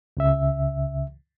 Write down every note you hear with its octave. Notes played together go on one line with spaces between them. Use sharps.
C#2 C#3 E5